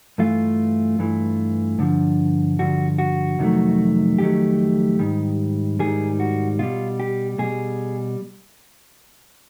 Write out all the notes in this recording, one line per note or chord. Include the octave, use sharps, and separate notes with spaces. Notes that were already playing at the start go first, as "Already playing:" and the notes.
G2 E3 A3 F4
G2 E3 A3
G2 D3 F3
G2 D3 F3 F#4
F#4
F2 C3 D#3 F#3 A3
F2 C3 D#3 F#3 A3 G4
G#2 D#3 G3
G#2 D#3 G3 G#4
F#4
B2 G3 F4
G4
B2 G3 G#4